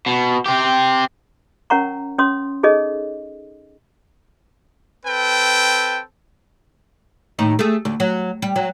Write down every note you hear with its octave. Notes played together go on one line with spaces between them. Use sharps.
B2
C4 G4
C#4 A#4 C#5 F#5 A#5 C#6
C#4 C#5 C6 D#6
D#4 G#4 A4 C#5 D#5
C4 A4 B4 G5
D#2 A2 D#4
A3 G#4
D2
F#3
G3
F#3